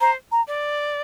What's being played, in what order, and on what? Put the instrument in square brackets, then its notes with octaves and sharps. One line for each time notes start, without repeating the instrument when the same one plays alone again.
[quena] C5 [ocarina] A#5
[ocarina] A#5
[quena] D5